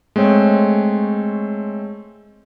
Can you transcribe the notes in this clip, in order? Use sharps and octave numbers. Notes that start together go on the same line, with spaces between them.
G#3 A3 C4 C#5